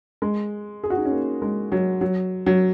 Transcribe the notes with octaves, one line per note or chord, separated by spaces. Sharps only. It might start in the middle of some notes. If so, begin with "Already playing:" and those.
G#3
G#4
F#4
D#4
C#4
A#3
G#3
F#3
F#3
F#3